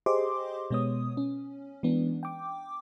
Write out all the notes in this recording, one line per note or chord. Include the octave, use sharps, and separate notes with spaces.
G4 G#4 C5 D#5 C6 D6
B2 G#3 B3 C#5 D#6
C#4
E3 G#3 B3 D4
G5 D6